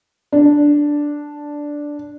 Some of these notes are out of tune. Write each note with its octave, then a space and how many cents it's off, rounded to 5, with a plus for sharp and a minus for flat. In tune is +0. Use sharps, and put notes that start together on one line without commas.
D4 -5